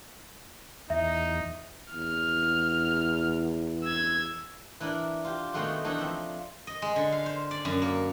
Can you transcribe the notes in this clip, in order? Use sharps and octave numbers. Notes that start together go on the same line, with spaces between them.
E2 D#4 E5
E2 F6
E6 G#6
E3 D4 E4 A#4
F4 G4
B2 D#3 G#3 A3 F#4 C6
D#3 E3 D4 A4 D#5
F3 C4 E5
D#5
G#3
D3
F5
C5
D5
F#2
A#3